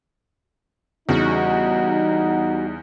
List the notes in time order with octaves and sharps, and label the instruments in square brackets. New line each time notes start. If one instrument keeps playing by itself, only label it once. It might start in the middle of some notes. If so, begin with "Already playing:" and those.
[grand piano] E2 C#3 [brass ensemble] G3 D#4 [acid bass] F#4